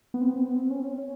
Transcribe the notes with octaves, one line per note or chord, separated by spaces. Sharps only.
B3
C4
B3
C4
B3
C4
C#4
C4
C#4
C#4